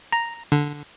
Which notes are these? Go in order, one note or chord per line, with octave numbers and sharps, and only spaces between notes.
A#5
D3